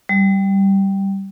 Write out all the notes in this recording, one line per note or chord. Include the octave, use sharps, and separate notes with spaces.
G3